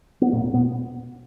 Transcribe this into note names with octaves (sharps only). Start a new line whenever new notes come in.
B3
E1 A#2 A#3
B2 B3